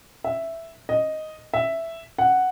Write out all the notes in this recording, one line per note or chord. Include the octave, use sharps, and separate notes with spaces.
E5
D#5
E5
F#5